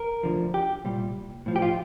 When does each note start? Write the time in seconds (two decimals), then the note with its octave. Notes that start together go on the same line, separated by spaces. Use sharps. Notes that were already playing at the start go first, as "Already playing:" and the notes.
Already playing: A#4
0.23 D2 D3 F3
0.54 G4
0.84 C2 A#2 G3
1.46 A2 F3
1.56 G4
1.62 F4